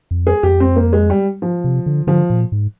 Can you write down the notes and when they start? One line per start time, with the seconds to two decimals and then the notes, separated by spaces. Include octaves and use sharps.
0.11 F2
0.27 G#4
0.43 F2 G4
0.60 C4
0.76 A#3
0.93 G#3
1.10 G3
1.42 F3
1.64 C3
1.86 D3
2.07 D3 F3
2.30 A#2
2.52 G#2